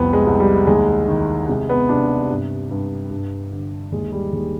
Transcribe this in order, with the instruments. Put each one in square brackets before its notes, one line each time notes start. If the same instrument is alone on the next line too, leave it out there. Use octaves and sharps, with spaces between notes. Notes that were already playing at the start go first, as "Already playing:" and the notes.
Already playing: [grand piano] C2 F2 B3
G#3
C2
G3
D#2 G#3
D#3
C3 G#3
B3
C3 D4
G2
G2
G2
D3
D#2 G#3
G3
D#2 G#3